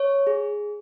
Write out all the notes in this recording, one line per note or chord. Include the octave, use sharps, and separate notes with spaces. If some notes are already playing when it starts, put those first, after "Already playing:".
Already playing: C#5
G#4